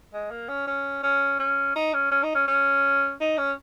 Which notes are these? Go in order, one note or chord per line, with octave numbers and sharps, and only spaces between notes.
G#3
A#3
C#4
C#4
C#4
C#4
D#4
C#4
C#4
D#4
C#4
C#4
D#4
C#4